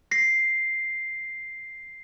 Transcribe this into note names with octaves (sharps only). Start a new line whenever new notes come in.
A#6 C7